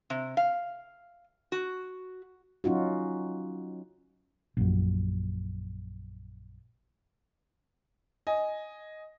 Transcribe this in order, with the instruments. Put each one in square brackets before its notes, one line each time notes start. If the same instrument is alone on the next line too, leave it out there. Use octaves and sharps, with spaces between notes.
[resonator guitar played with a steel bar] C3
F5
F#4
[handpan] F#3 C#4 D#4 F4 F#4
[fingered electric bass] A#1 F#2
[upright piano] D#5 G#5